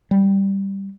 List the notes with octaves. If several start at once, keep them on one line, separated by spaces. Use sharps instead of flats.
G3